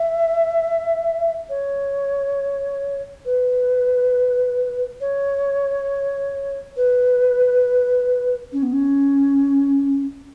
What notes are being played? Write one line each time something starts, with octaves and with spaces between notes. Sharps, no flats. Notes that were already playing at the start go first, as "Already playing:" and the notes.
Already playing: E5
C#5
B4
C#5
B4
C#4
B3
C#4